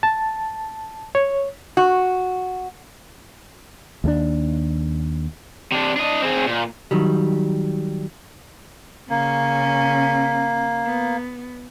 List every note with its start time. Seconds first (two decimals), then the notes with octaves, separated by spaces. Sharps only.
0.03 A5
1.15 C#5
1.77 F#4
4.04 D#2 G#3 D4
5.72 C3 D4
5.96 D4 D#5
6.22 C4 G#4
6.47 A#2
6.91 D#3 F#3 G3
9.10 C#3 A#3 C#4
10.85 B3